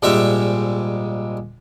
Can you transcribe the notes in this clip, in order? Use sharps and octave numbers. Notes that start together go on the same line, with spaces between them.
A#1 G#2 G3 G#3 G4 E5